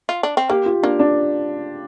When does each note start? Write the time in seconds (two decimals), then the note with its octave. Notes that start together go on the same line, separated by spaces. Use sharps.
0.09 F4
0.23 D4
0.37 C4
0.50 A#3 G4
0.66 F4
0.83 A#3 D4
0.99 D4